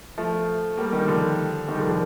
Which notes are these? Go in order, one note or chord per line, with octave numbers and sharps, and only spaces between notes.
F3 A3
G3 A#3
D#3 G3
D3 F3
D#3 G3
D3 F3
D3 F3